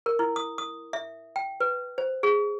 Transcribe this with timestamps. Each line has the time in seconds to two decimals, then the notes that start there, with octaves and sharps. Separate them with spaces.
0.06 A#4
0.19 E4
0.36 D#6
0.58 D#6
0.93 E5
1.36 G5
1.60 B4
1.98 C5
2.23 G#4